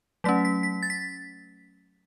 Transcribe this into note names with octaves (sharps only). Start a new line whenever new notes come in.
F#3 A3 C#4 B6
B6
B6
A6
B6